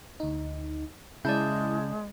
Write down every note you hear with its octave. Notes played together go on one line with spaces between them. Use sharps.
D2 D#4
C#3 G#3 E4 D5 A5 G6